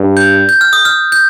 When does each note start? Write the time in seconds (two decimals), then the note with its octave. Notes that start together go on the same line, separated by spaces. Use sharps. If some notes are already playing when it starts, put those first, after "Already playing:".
Already playing: G2
0.17 G6
0.49 G6
0.61 F6
0.73 D#6
0.85 F6
1.12 G6